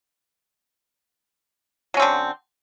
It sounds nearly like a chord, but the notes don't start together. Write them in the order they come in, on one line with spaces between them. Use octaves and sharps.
F#3 C#4 C4 D3